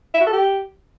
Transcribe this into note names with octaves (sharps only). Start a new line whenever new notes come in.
E5
F#4
A4
G4